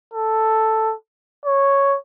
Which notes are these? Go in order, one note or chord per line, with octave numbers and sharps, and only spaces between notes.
A4
C#5